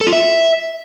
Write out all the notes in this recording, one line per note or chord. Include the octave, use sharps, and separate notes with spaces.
A4
F4
E5